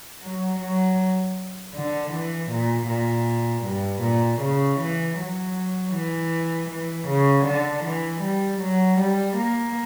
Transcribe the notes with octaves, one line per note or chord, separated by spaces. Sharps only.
F#3
F#3
D3
E3
A#2
A#2
G2
A#2
C#3
E3
F#3
E3
E3
C#3
D3
E3
G3
F#3
G3
A#3